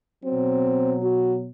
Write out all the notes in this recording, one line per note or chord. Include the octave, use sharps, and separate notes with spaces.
B2 F#3 C4
F#4